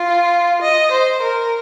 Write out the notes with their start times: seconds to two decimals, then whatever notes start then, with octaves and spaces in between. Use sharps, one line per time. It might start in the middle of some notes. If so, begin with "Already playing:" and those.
Already playing: F4
0.62 D#5
0.92 C5
1.22 A#4